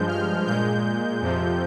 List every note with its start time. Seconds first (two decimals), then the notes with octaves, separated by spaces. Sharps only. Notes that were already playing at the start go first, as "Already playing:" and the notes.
Already playing: G2 F3 G#3 G6
0.08 F6
0.46 A#2 G#3 G6
1.21 F2 C3 F3